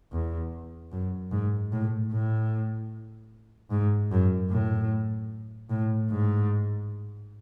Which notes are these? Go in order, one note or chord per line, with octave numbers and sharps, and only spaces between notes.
E2
F#2
G#2
A2
A2
G#2
F#2
A2
A2
G#2